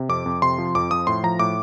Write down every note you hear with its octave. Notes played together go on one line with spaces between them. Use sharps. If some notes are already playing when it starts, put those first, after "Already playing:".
Already playing: C3
F2 D6
F2
C3 C6
F3
F2 D6
F3 D#6
A2 C6
F3 A#5
A2 D6